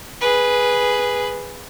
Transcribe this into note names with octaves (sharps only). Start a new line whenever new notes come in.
G#4 B4